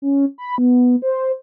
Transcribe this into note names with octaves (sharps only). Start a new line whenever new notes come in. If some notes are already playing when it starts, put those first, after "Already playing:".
C#4
B5
B3
C5